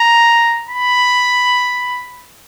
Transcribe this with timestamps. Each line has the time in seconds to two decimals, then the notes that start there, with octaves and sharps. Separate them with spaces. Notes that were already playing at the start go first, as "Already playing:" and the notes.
Already playing: A#5
0.69 B5